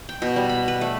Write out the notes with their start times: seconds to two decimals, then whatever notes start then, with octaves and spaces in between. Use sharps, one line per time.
0.09 G5
0.22 B2
0.36 G3
0.49 B5
0.68 B4
0.81 A3